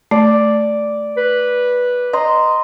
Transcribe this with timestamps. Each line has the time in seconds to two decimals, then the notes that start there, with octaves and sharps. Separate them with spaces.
0.11 A3 D5
1.17 B4
2.13 D#5 A#5 C6